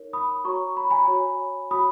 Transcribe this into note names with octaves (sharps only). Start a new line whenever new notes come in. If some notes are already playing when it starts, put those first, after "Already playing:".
Already playing: D#4 A#4 C#5
B5 D#6
F#4 C#5 A#5 C#6
B5
A#5
G#5 B5
F#4 C#5
F#4 C#5 B5 D#6